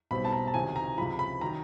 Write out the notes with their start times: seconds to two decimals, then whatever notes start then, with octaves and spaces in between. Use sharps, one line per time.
0.11 B1 B2 G3 C4 B5
0.24 A5
0.32 A#5
0.47 A5
0.54 C#2 C3 D#3 F#3 G#5
0.76 A#5
0.98 C#2 C3 F3 B5
1.19 B5
1.41 D#3 F#3 A#5